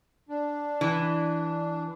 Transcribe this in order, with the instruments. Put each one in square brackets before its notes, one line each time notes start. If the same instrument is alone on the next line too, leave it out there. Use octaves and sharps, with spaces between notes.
[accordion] D4
[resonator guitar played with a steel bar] E3